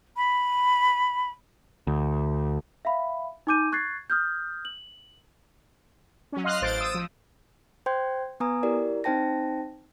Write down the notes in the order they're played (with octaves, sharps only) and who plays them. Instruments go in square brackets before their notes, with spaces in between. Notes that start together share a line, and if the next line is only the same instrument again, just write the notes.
[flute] B5
[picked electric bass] D2
[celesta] E5 F5 B5
D#4 G#5 D6 G6 D#7
C#6 F#6 G#6 A6 C7
D#6 F6 G6
F#7
[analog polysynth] F#3 C#4
D#5 F5 C6 F6 F#6
A1 C5 A6 D7
D#6 E6
F3
[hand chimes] C5 G5 C6 G6 G#6
B3 B4 G#5 A#5 D#6
E4 G4 A#4 D5
C4 D#4 C5 G5 A5 A#6